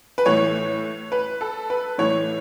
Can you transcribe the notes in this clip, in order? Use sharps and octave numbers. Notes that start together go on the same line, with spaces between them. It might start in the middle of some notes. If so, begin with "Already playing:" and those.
B4
A2 E3 C#5
B4
A4
B4
A2 E3 C#5